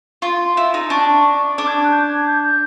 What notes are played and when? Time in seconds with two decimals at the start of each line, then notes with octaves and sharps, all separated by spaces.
0.22 F4 C6
0.57 E4
0.74 D#4
0.90 D4 C#6
1.57 D4 D6
1.66 G#6
1.83 F#6
1.91 G6
2.08 G#6
2.26 G6
2.43 G6